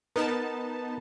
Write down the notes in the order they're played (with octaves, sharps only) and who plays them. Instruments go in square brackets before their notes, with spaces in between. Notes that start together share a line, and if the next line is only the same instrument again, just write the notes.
[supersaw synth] B3 D#4 A5 [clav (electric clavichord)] A#4